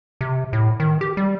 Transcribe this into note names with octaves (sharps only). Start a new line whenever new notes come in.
C3
A2
D#3
G4
G3